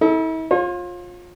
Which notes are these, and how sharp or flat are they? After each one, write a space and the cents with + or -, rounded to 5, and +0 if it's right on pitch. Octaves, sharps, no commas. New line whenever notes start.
E4 -45 A4 +0
F4 +25 C#5 -40